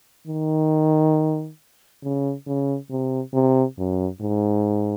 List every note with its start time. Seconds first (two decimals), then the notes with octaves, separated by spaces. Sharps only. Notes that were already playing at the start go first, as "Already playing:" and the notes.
0.28 D#3
2.03 C#3
2.47 C#3
2.90 C3
3.34 C3
3.78 F#2
4.21 G#2